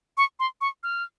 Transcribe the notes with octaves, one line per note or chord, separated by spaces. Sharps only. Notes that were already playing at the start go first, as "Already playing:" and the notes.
C#6
C6
C#6
F6